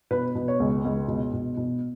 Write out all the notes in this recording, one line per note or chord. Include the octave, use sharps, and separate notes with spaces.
B2 B4
B2
C#5
C#2
C#2
B2
B2
B2